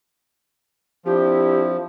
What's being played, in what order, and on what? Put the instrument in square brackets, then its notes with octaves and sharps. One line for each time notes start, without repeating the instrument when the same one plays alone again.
[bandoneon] F3 [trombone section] C4 D4 E4 [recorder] G4